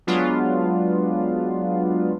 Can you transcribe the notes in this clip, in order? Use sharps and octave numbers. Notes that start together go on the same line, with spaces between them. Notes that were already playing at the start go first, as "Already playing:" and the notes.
F#3 G#3 B3 D4 F4